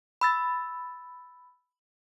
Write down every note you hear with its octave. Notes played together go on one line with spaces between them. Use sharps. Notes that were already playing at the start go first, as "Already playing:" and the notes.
B5 E6 A6